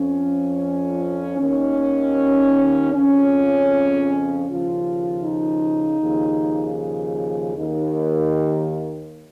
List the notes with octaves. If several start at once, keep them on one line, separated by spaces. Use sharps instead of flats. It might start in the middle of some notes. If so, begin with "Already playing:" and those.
Already playing: F2 F3 C#4
D#2 D#3 C#4
F2 C#3 F3 C#4
D#2 C#3 F3 F4
D#4
D#2 C#3 F3
D#2 D#3